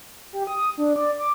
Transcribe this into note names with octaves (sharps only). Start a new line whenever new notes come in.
G4
D#6
D4
D5
D6